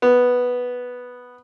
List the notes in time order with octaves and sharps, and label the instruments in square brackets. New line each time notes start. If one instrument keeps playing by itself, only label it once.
[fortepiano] B3